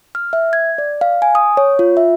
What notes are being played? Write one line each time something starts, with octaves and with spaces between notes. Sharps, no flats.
F6
E5
G#6
D5
F5
G#5
D#6
C#5
F4
E5